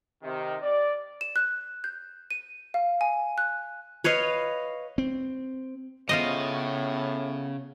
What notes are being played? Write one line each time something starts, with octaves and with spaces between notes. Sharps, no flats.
C3 D#3
D5
E7
F#6
G6
D#7
F5
G#5
F#6
B4 C#5 D#5 F5
C4
A2 C#3 B3 F4 C5 D#5